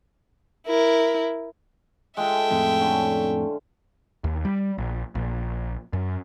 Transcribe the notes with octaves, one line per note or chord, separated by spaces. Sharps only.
E4 A#4
G#3 F4 A4 E5 G5
F2 A2
D3 C#4
D#2
G3
A#1
A#1
F#2